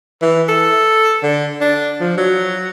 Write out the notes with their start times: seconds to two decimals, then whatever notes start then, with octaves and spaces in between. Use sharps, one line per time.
0.22 E3
0.49 A4
1.23 D3
1.61 D4
2.00 F3
2.17 F#3